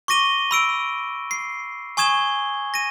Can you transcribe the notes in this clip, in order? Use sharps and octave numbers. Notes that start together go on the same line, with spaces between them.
C#6 D6 A#6 D#7 G7
B5 E6 D7
C7
G#5 C#6 D#6 G#6 E7 G7
A#6 D#7